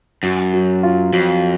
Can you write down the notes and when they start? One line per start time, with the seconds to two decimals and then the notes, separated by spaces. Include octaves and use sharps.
0.23 F#2 F#3
0.53 F#3
0.83 F4
1.13 F2 F#3